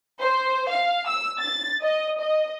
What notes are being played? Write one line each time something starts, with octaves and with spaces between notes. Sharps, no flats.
C5
F5
E6
A6
D#5
D#5